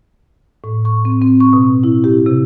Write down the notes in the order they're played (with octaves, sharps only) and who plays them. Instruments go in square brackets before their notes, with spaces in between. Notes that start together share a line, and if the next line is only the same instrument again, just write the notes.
[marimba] A2
C#6
C4
C4
C#6
B2
E4
G4
C3